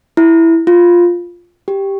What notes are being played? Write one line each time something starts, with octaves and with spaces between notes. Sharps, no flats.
E4
F4
G4